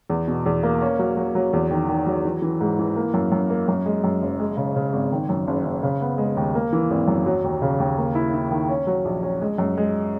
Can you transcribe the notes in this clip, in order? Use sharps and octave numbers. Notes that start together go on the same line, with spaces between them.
E2
B2
E2
A#3
C#4
F#3
F#3
F#3
E2
D#3
D#3
F#3
E3
E3
G#2
E3
A#3
F#2
F#2
A#3
F#2
G#3
F#2
F#1
G#3
C#3
C#3
G#1
D#3
F#2
F#1
F#1
C#3
B3
G#3
D#2
A#3
E3
G#1
F#2
F#3
D#2
C#3
D#2
A#3
E4
E4
D#3
C#4
F#3
A#1
C#4
G#3
F#2
G#3